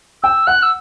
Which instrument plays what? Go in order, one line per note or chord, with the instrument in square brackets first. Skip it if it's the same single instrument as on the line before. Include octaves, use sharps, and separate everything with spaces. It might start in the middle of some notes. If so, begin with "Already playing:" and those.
[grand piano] G5 [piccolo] E6
[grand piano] F#5 [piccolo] F#6
[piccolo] E6